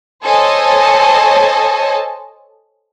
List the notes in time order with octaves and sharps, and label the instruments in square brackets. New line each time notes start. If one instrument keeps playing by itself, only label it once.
[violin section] A4 C5 C#5 D#5 G#5 A5